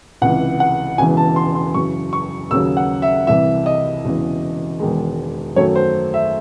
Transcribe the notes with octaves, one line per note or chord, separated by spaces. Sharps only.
C#2 C3 E3 F#5
F#5
E1 E2 C#3 E3 G#5
A5
C6
C6
F#2 C#3 E3 C#6
C#6
D#2 C#3 F#3 E6
F#5
E5
C2 C3 E3 E5
D#5
E1 E2 C#3 E3
E1 E2 D#3 G#3
F#2 D#3 F#3 A3 C#5
C5
E5